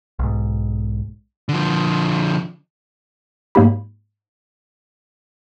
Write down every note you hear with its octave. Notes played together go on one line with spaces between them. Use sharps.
B1 G#2
D3 F3
G#2 F#3 A#3 D#4 G4 B5